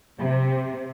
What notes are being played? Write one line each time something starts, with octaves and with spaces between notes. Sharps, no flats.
C3